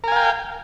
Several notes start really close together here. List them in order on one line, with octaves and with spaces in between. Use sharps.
A#4 G#5 F5 G5